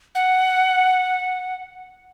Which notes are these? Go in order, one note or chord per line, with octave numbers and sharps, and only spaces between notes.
F#5